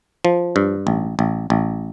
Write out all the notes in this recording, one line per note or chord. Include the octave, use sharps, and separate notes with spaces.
F3
G2
A1
A1
A1